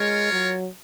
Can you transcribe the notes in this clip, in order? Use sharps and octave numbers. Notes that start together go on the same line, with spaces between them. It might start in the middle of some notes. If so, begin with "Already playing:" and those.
Already playing: G#3 F4 A#4 C#5
F#3